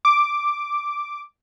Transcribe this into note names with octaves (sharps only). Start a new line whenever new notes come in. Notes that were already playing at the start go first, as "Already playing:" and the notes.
D6